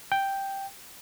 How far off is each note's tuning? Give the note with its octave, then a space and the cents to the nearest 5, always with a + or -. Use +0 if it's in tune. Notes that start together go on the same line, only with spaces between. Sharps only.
G5 +0